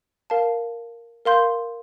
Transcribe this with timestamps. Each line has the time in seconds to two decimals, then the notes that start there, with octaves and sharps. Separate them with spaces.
0.30 A#4 F5 A5
1.25 A#4 F5 C6 G6